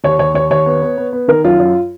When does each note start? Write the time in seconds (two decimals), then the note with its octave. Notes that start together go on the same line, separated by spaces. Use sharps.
0.04 D#2 C#5
0.19 D#2 C#5
0.35 D#2 C#5
0.51 D#2 C#5
0.66 B3
0.82 B3
0.98 B3
1.13 B3
1.28 D#3 A#4
1.44 F#2 F4
1.60 F#2